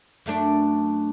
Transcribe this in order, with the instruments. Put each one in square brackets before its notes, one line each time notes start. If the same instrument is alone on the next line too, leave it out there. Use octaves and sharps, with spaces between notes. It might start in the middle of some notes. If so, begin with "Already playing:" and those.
[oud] F#2 A3 D4